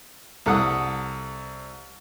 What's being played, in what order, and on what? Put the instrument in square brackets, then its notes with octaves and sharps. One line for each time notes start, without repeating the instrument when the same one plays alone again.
[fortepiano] C2 A4 F#5 D#6